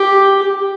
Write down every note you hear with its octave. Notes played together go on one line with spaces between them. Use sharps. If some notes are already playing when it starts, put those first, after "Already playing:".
Already playing: G4